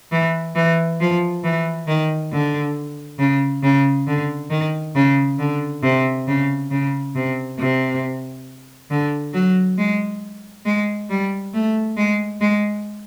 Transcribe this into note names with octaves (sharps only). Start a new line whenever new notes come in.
E3
E3
F3
E3
D#3
D3
C#3
C#3
D3
D#3
C#3
D3
C3
C#3
C#3
C3
C3
D3
F#3
G#3
G#3
G3
A3
G#3
G#3